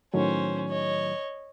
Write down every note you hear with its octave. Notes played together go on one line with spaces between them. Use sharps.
A2 D#3 F#3 C#4 C5
C#5 D#5